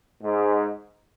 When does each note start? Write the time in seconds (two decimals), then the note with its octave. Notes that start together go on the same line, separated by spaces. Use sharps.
0.23 G#2